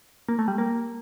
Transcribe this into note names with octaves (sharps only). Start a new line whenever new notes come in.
A#3
A3
G3
A#3